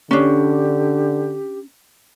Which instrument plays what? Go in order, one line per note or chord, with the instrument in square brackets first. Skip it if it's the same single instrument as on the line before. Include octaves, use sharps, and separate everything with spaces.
[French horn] D3 [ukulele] C#4 D4 [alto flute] G4